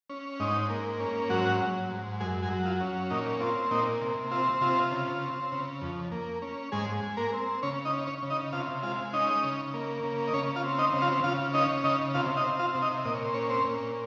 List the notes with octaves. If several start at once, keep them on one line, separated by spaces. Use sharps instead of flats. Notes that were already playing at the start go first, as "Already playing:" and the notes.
C#4
G#2 D#4
A#3
C#4
G#2 F#3 F#4
F#3
G#2
F#2 G#3 G#4
G#3 G#4
F#3
F4
C#4
A#2 D#4
C4 F4
A#2 D#4
C3
C4 F4
C3 F4
C#3
C4
C#3
F2
A#3
C#4
G#2 G#3 G#4
G#3
A#3 A#4
C4
C#3 C#4 C#5
D#4 D#5
C#4
C#4 C#5
C#3
D#4 D#5
C3 F4 F5
G#3 F4 F5
C#4 D#4 D#5
C#3
A#3
C#3
D#5
C#3 C#4 C#5
F4 F5
C4
D#4 D#5
C#3
F4 F5
C#3 F4 F5
C#4 D#4 D#5
C#3 D#4 D#5
C3 F4 F5
D#4 D#5
C4
F4 F5
C3
D#4 D#5
A#2 D#5
C#5
C5
C#4 C#5
C4 C5
A#2